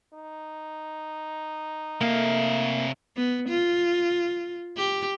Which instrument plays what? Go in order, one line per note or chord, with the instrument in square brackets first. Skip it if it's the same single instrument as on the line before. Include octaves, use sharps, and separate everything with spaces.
[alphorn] D#4
[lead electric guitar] C3 F5 [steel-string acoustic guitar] A3 [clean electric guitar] A#3
[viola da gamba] B3
F4
G4